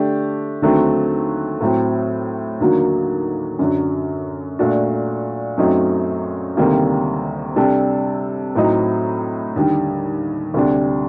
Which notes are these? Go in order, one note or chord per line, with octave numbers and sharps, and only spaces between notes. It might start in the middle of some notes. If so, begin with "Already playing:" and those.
Already playing: D3 A3 D4 G4
D#2 D3 F#3 A3 C4
A2 F#3 C4
D#2 D3 F#3 A#3 F#4
F#2 D3 F#3
A#2 A3 D4 F#4
F#2 F#3 A3 C4 D#4
D2 C3 D#3 G3 A#3
C3 G3 D4 A4
A2 F#3 C4 D#4
D#2 D3 G3
D2 C3 G3 D4